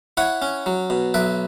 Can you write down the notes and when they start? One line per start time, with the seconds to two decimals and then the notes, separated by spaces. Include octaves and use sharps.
0.17 E4 C#5 F#5
0.42 C#4
0.66 F#3
0.90 B2
1.14 B1 B4 E5